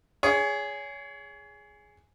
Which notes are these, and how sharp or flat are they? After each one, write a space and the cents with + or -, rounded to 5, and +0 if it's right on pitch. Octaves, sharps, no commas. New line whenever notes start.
G#4 +0 C#5 +30